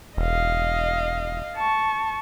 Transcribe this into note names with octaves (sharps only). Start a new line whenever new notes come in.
E1 D#5 F5
A5 C#6